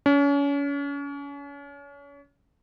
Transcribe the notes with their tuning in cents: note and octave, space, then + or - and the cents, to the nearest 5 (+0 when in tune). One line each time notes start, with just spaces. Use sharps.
C#4 +35